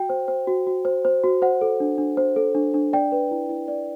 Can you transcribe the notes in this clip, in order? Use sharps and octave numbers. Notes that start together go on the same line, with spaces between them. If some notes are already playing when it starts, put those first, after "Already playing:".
Already playing: F#4 G5
C5
C5
F#4
F#4
C5
C5
F#4
C5 F#5
A4
D4
D4
C5
A4
D4
D4
D5 G5
B4
E4
E4
D5